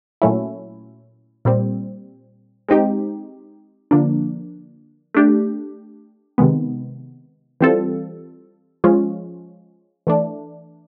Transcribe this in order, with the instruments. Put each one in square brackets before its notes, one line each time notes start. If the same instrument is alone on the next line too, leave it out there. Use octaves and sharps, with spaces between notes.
[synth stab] A#2 F#3 A3 C#4 E4
A#2 G3 C4
G#3 C4 D#4 G4
D3 F3 A#3 D4
A3 D4 G4
C3 D#3 G#3 B3
E3 G3 C4 F4 A4
F3 G#3 C#4 F4
E3 A3 D4